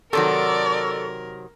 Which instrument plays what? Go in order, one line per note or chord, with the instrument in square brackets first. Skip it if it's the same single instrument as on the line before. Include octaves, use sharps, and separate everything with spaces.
[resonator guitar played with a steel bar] C3 D#3 F#3 [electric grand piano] A4 [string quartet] A#4 [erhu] D5